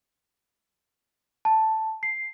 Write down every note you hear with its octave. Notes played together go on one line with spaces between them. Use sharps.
A5
C7